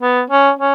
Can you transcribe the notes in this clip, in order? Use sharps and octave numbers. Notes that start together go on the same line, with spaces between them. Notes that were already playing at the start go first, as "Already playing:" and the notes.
B3
C#4
C#4